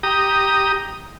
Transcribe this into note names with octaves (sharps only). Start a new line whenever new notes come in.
G4 A#5 D#6